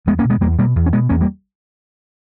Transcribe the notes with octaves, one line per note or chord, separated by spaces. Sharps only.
E2 G#3 B3
A#3 C#4
B2
G#3 B3
E2 G3 A#3
B2 G3 A#3
E2
C#4
B2 G#3 B3
E2 A#3 C#4
G3 A#3